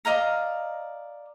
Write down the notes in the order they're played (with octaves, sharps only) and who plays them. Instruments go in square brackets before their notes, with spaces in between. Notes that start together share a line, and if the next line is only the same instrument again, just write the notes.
[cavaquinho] D5 D#5 F5 A#5